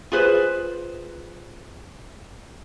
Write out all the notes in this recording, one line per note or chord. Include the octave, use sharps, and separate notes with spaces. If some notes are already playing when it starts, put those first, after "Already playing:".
F4 G#4 B4 C5